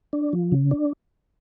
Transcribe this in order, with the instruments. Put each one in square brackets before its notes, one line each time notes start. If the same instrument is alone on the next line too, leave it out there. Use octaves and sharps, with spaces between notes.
[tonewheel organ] D4
F3
C#3
D4